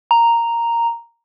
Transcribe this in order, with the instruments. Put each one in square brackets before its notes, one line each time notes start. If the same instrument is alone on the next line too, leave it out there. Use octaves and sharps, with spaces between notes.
[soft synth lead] A#5